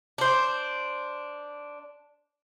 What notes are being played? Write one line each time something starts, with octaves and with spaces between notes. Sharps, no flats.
D4 C5